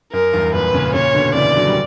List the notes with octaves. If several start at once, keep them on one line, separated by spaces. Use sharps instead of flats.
F#2 A#4
E2 G2
F#2 A#2 B4
A#2 C#3
A#2 C#3 C#5
B2 D3
C#3 E3 D5
D3 F#3
G3